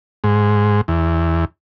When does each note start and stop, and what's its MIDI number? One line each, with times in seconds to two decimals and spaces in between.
0.24 0.81 44
0.88 1.45 40